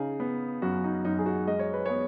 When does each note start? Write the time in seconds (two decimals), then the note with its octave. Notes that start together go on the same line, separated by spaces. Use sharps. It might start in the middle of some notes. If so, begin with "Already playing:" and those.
Already playing: C#3 D#4 G#4
0.20 B3
0.62 F#2 F#4
0.84 D#4
1.05 F#2 D#4
1.19 G#4
1.26 F#4
1.47 G#3 D#5
1.59 C#5
1.73 B4
1.86 B3 G#4 C#5